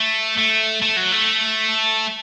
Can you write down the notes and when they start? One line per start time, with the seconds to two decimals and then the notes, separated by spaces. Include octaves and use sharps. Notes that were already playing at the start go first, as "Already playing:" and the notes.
Already playing: A3
0.38 A3
0.82 A3
0.97 F#3
1.12 A3